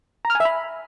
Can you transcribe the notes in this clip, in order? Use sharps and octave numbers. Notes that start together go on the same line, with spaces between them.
A#5
F6
G#5
E5
B5